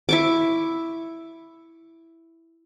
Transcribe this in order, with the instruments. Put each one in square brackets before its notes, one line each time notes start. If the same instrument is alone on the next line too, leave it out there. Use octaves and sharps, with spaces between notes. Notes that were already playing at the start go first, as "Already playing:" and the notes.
[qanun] E4 C#6 D6